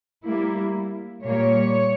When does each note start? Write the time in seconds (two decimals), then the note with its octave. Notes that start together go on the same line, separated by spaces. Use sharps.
0.24 G3 A#3 E4
1.23 A#2 G3 A#3 C#5